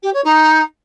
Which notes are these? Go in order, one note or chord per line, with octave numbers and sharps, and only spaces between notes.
G4
C#5
D#4